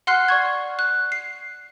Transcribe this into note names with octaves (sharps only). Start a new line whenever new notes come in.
F#5 C6 F6 F#6 C7
D5 C#6 G#6
F#6
C7